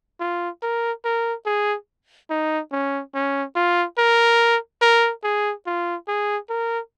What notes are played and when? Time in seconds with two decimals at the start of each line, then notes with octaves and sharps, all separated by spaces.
0.20 F4
0.62 A#4
1.05 A#4
1.46 G#4
2.30 D#4
2.72 C#4
3.14 C#4
3.56 F4
3.98 A#4
4.82 A#4
5.24 G#4
5.66 F4
6.08 G#4
6.50 A#4